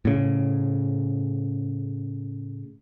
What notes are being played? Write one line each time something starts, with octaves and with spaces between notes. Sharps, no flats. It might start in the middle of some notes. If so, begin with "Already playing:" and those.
A2 C#3